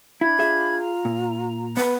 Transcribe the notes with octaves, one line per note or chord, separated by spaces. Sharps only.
D4 E4 B5 G#6
F4 G#4 E5
A#5
A#2
B3 B4